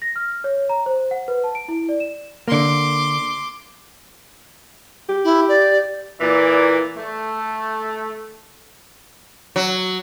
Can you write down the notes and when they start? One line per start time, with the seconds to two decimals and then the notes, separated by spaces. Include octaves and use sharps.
0.02 A#6
0.16 F6
0.44 C#5
0.69 A#5
0.86 C5
1.11 F#5
1.28 B4
1.44 A5
1.55 D7
1.68 E4
1.89 D5
2.00 E7
2.48 D3 A#3 C6 D6
5.09 G4
5.24 E4
5.48 D5
6.21 A#2 E3 D5
6.97 A3
9.56 F#3